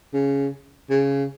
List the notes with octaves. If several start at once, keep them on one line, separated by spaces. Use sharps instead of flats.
C#3
C#3